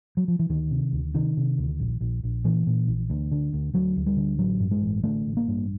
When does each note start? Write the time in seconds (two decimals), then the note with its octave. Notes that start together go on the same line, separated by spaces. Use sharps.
0.17 F#3
0.28 F3
0.39 E3
0.49 D2 D#3
0.71 C3
0.93 D2
1.14 C3 D#3
1.37 C3
1.58 D2
1.80 A#1
2.01 A#1
2.23 A#1
2.44 A#2 E3
2.67 A#2
2.87 A#1
3.10 D2
3.32 D3
3.53 D2
3.74 D2 F#3
3.96 D2
4.06 G3
4.17 D3
4.39 A1 F#3
4.60 G2
4.71 G#3
4.82 A1
5.03 D3 A3
5.26 A1
5.37 A#3
5.48 G2